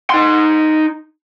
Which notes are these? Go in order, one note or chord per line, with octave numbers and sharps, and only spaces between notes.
D#4 C6